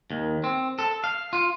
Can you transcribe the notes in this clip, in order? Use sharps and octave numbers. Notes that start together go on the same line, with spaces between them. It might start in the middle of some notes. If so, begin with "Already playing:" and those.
D#2
C4
A4
F5
F4